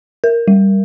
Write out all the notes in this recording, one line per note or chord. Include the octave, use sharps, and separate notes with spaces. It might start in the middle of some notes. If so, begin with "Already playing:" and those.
A#4
G3